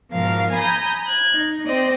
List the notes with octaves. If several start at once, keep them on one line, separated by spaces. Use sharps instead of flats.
G#2 B2 F3 A#4 F5
G#5 A#5 B5 D#6 G6
F#6 G#6
D#4
C4 C5 D5 D#5